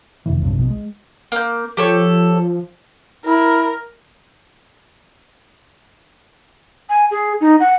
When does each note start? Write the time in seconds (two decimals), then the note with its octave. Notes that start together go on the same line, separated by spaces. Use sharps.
0.26 F1 C3 D#3 E3
0.42 B1 G2 C3
0.55 A#1 B2
0.70 G#3
1.32 A#3 G6
1.77 F3 G4 A4 C#5
3.26 E4 A#4
6.89 G#5
7.11 G#4
7.41 D#4
7.60 F#5